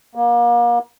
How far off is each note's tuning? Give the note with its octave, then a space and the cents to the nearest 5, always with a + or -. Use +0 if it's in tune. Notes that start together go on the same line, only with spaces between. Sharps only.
A#3 +35